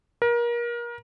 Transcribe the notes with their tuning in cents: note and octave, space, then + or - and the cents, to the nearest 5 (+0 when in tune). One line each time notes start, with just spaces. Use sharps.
A#4 +30